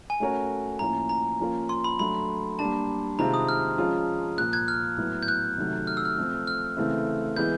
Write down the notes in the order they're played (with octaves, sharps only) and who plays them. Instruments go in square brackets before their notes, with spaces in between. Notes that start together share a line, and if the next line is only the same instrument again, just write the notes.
[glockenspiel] G#5
[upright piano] A3 C#4 F#4 A#4 C#5
[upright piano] A2 F3 A#3 C#4 [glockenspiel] A#5
[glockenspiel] A#5
[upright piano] F3 A#3 C#4 F4 A#4
[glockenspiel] C6
B5
[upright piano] F#3 A3 D4 [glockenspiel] B5
[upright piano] G3 A#3 D4 [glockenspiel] A5
[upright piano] C3 D#3 G#3 C4 F4 [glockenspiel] A#5
[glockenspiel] D#6
F6
[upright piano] F3 G#3 C#4 F4
[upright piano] A#2 F3 A#3 [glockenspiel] F#6
[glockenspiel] F#6 G#6
F6
[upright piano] A2 F#3 B3
[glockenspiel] G6
F#6
[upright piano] C3 D#3 F#3 A3
[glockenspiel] F6
E6
F6
[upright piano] F3 A3 C4
[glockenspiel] F6
[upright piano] C#3 E3 A3 C4 E4
[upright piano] E3 G#3 B3 [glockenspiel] G6